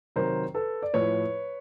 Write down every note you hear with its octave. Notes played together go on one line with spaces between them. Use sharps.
C3 D#3 F#3 A#4 C5
A4 B4
D5
A2 F3 B4 C#5